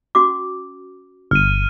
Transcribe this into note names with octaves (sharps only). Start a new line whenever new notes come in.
C#4 F#4 D6
G1 F6 D#7